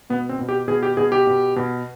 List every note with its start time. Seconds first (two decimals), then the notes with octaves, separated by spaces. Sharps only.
0.10 B2 B3
0.29 C4
0.39 B2
0.49 G4
0.68 B2 G#4
0.83 G4
0.97 B2 G#4
1.12 G4
1.27 B2
1.56 B2